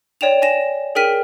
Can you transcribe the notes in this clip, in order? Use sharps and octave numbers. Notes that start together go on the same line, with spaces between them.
C#5 D5 G5 E7 F7
D5 G#5 A#6 E7
G#4 A#4 G5 F6 B6 D#7